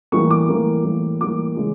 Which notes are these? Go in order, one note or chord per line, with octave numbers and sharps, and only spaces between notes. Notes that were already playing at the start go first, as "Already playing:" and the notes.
A2 E3 G3 A#3 C#6
D6
A2 E3 G3 A#3
A2 E3 G3 A#3
A2 E3 G3 A#3 D6
C#3 E3 G#3